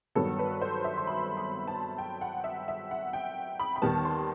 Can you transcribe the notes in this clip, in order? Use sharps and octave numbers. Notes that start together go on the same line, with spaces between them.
G2 D#3 F#3 B3 A4
B4
C5
E5
C6
B5
B5
A5
G5
F#5
E5
E5
F#5
G5
B5
B5
D#2 D#3 G3 B3 A5
C6